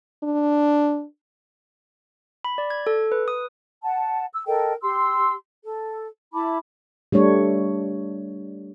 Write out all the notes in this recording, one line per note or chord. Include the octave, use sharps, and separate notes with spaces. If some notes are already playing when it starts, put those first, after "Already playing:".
D4
B5
D5
G#6
A4
B4
D#6
F#5 A5
E6
A4 A#4 D#5 G5
G4 C6 E6
A4
E4 A5 B5 D6
G3 A3 D4 C#5